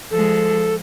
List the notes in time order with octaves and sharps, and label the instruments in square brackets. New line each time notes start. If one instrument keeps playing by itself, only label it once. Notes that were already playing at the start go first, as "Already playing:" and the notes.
[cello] F3 G#3 [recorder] A4